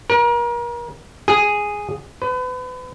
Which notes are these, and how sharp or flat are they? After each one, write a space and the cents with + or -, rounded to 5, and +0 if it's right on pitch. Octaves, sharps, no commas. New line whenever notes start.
A#4 +35
G#4 -5
B4 +35